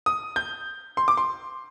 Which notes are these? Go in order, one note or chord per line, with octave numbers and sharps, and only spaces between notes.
D#6
G6
C6
D6
C6